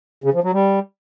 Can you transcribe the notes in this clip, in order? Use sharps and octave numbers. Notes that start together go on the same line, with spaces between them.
C#3
F3
F#3
G3